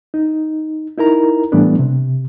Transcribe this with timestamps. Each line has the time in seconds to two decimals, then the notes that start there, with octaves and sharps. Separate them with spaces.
0.14 D#4
0.97 D#4 E4 A#4 A#5
1.52 A2 E3 G3 A3 B3 D4
1.79 C3